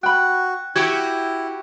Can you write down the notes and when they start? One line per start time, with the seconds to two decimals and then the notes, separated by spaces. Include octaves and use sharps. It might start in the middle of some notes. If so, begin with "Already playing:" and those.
0.03 F#4 G5 B5 F#6
0.76 E4 F#4 G4 G#6